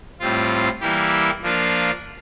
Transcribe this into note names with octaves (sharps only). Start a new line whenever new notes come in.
A2 G3 C4 F4
E3 G3 A#3 E4 G4
F3 A#3 D4 F4